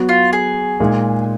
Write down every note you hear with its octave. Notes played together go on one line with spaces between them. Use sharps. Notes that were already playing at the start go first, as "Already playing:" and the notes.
Already playing: F#3 B3 F#4
F4
G#4
A#2 G#3 D#4